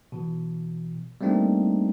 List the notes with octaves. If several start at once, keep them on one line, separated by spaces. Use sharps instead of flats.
B2 E3
G3 A3 A#3 C4 D4 D#4